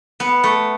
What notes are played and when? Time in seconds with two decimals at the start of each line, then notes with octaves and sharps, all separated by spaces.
0.20 B3
0.44 A3